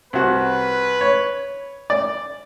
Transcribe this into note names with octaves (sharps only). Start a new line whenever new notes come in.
C2 F#4 B4
C#5
D5